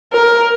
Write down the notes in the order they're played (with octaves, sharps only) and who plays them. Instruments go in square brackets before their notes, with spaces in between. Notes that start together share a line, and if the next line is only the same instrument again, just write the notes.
[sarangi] A#4